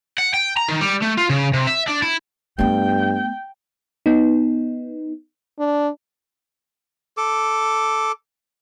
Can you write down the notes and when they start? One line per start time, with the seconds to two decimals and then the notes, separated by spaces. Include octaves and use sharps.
0.18 F#5
0.34 G5
0.57 A#5
0.69 D#3
0.81 G3
1.02 A3
1.18 F4
1.29 C#3
1.53 C3
1.67 E5
1.88 D4
2.02 E4
2.59 G2 A3 B3 G5
4.06 B3 D#4
5.59 D4
7.17 A4 D6